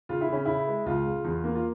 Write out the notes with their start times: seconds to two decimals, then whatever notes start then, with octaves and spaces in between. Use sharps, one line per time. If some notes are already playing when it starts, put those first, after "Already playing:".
0.09 C#3 F4
0.21 E4
0.28 C#3 C#4
0.45 C#3 E4
0.67 G#3
0.86 C#2 F4
1.06 C#3
1.24 E2
1.44 A#3
1.55 F4